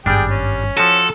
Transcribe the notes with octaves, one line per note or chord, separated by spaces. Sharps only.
G#1 G2 G3 D4 G#4 G5
C#4
F3 F#4 A4